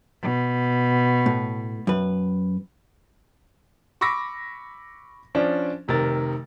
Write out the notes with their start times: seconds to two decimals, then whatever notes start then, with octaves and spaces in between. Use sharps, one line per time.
0.23 B2
1.26 A2
1.87 F#2 B4
4.01 B5 C#6 D6 E6 A#6 B6
5.35 F3 C#4 D4 C5 D5
5.88 F1 C3 D#3 A#4 A6